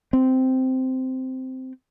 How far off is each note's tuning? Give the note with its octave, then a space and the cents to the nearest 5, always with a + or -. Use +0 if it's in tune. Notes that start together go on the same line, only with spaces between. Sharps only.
C4 -10